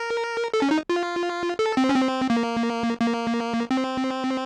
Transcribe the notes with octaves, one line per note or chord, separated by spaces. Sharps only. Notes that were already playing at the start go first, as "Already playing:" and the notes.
Already playing: A#4
A4
C#4
D#4
F4
A4
C4
C#4
C4
A#3
A#3
C4